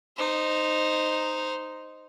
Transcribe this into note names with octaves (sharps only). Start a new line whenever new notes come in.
D#4 C5